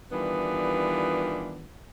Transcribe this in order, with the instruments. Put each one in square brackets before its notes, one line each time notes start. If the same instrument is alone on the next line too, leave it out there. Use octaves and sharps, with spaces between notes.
[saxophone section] D#3 E3 G3 B3 D4 F4